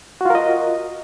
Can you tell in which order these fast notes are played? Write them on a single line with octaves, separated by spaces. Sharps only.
F#4 F4 A#4 D#5